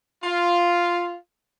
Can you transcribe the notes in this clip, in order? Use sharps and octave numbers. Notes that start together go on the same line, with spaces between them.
F4